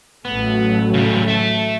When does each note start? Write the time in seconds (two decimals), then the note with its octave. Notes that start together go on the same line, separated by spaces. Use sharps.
0.25 A1 F#3 A3 B3
0.94 C#3 G3
1.28 E5 A5